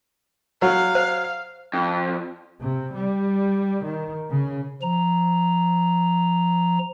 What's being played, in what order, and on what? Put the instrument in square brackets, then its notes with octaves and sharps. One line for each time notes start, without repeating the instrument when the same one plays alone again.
[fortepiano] F#3 [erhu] F5
[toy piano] C5
[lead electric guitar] F2
[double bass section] C3
G3
D#3
C#3
[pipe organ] F3 A#5